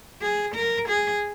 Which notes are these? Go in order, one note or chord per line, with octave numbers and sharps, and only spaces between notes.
G#4
A#4
G#4